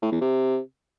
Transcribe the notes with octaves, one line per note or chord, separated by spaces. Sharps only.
A2
E2
C3